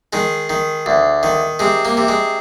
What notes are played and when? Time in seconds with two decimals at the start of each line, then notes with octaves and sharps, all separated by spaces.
0.13 D#3 G#3
0.50 D#3
0.86 D2
1.23 D#3
1.59 C3 G#3
1.85 A#3
1.97 C3
2.08 G#3